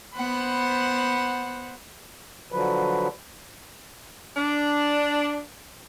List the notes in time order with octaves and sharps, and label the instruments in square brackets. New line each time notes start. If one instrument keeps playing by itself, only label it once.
[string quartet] B3 C5 F#5 B5
[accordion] D3 F3 F#3 B4
[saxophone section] D4